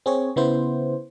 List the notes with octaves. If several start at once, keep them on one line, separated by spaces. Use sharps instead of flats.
C4 G#4 C#5
C#3 B3 E4 C5